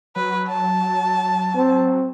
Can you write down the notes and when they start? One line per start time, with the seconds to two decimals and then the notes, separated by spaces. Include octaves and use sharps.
0.16 F#3 B4
0.48 A5
1.56 C4